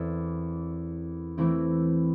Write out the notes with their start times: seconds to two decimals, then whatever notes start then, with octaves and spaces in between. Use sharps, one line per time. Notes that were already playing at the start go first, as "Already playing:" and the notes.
Already playing: E2 E3 C4 A4 E5
1.38 E3 A3 C4 E4